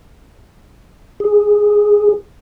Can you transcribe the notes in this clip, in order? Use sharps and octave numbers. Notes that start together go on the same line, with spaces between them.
G#4